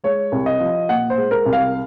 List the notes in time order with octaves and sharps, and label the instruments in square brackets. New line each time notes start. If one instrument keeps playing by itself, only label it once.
[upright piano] G#3 C#5
C2
D#5
F3
A#2 F#5
C5
G#3
A#4
C2
F5